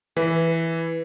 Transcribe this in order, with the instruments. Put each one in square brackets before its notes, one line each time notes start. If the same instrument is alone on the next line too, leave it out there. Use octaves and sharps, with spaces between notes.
[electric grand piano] E3 [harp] B4